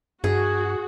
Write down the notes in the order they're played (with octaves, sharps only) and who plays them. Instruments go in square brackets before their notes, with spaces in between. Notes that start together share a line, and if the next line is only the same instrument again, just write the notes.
[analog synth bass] G2 [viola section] F#4 [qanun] G#4